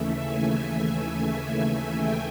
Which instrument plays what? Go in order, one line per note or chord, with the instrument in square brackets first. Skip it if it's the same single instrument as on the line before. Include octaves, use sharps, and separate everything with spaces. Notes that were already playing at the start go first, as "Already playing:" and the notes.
Already playing: [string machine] D#2 C#3 E3 A3 E5
G#5
G5